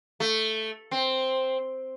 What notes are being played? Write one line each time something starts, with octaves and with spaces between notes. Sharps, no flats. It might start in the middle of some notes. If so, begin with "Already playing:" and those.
A3
C4